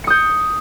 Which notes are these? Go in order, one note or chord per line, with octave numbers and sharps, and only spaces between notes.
D#6 G6 C#7